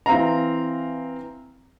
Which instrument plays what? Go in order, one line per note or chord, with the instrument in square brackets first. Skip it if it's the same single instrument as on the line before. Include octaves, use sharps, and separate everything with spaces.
[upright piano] E3 C4 F5 A#5